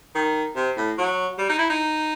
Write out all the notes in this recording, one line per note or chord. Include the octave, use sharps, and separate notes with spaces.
D#3
C3
A2
F#3
G3
D#4
E4
D#4